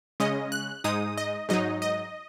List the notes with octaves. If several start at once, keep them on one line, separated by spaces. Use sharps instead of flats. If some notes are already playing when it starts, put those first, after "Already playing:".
C#3 G#3 C#4 D#5
F#6
G#2 G#3 D#4 D#6
D#5
G#2 F#3 D#4 D#5
D#5